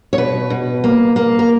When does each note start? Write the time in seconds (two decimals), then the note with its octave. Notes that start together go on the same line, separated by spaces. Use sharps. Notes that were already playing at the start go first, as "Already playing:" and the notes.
0.13 C#5
0.18 B2 B4
0.50 B2
0.84 A#3
1.16 A#3
1.39 A#4